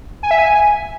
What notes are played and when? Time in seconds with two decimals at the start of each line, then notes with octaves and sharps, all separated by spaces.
0.23 G#5
0.31 E5
0.39 G#5